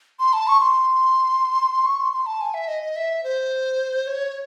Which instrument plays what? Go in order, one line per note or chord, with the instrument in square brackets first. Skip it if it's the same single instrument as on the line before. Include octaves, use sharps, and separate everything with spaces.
[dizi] C6
A5
C#6
C6
C#6
C6
C6
A5
G#5
E5
D#5
D#5
E5
C5
C#5